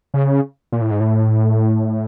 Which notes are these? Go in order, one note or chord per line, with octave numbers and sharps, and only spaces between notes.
C#3
A#2
A2
G#2
A2